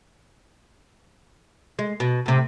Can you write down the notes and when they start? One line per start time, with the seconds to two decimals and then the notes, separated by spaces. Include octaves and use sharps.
1.79 G#3
2.00 B2
2.26 A2 C3